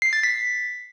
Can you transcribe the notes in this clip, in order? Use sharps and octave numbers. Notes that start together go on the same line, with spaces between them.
C7
A6
B6